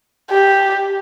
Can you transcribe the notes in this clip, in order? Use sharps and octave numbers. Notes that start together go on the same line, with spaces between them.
G4